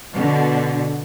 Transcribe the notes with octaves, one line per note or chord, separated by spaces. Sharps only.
B2 D3